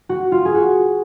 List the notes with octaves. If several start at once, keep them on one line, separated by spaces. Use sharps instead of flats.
F#4
F4
G#4
F#4